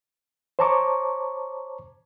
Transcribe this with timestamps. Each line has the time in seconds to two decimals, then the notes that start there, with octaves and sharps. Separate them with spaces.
0.59 C5 C#5 A5 A#5 C#6 D6